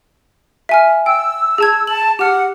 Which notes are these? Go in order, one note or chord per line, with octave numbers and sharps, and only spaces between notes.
E5 G#5 F6
G5 E6
G#4 A5 G#6
A5 F#7
G4 F#5 F6